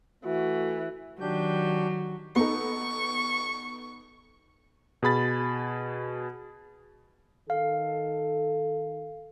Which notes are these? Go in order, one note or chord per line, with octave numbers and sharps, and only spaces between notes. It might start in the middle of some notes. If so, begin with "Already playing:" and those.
E3 A3 F#4
D#3 F#3 D4 G4 G6
B3 D#4 A4 C#6
B2 G#4 B5 A6
D#3 A4 F5